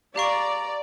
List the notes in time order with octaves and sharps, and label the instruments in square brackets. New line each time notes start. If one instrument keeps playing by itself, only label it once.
[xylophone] G4 F5 C#6 [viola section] D5 [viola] A#5